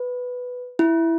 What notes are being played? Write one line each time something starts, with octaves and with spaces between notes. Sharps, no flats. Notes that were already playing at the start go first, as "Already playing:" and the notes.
Already playing: B4
E4